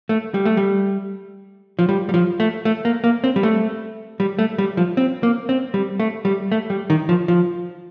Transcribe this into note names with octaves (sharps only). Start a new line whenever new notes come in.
A3
G3
A3
G3
F3
G3
G3
F3
A3
A3
A#3
A#3
C4
G3
A3
G3
A3
G3
F3
C4
A#3
C4
G3
A3
G3
A3
G3
D#3
F3
F3